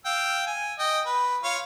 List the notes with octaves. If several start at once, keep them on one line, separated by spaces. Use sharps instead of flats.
F5 G5 E6
G#5
D#5 G5
B4
F4 C#5 F5